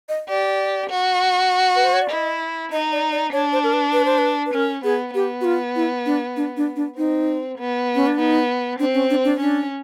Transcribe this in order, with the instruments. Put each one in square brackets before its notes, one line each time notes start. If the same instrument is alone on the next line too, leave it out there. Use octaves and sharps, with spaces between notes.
[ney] D#5
[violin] G4 [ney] D5
[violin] F#4
[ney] B4
C5
C#5
D5
[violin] E4 [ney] D#5
[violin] D#4 [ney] D#5
[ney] D5
D5
[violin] D4 [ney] C#5
[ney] C5
A#4
B4
B4
C5
B4
B4
[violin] C#4 [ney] A#4
[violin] B3 [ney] G#4
[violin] B3 [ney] G4
[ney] F#4
F4
E4
D4
D4
D4
D4
[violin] C4 [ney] D#4
[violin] B3
[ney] C#4
D4
[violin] B3 [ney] D#4
[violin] C4 [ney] D4
[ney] C#4
D4
D4
[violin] C#4 [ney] D4